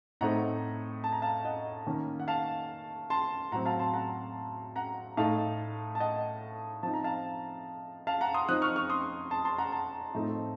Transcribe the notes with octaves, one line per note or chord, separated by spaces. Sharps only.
A2 A3 C4 D#4 F#5 A#5
A5
A#5
F5 A5
D#5 F#5
D#3 A#3 C#4
F#5
F5 A5
A5 C6
A2 F#3 C4 F#5 A#5
F5 A5
A5 C6
F#5 A#5
F#5 A#5
A2 A3 D#4 F5 A5
A5
D#5 F#5
F3 C4 D#4 A5
A#5
F5 A5
F5 A5
F#5 A#5
C6 D#6
F3 C4 D#4 D#6 F#6
C#6 F6
C#6 F6
C6 D#6
A5 C6
A5 C6
F#5 A#5
A5 C6
A2 F3 A3 C4 D#4